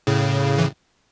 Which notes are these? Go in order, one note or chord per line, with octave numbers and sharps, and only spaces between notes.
A2 C#3
E3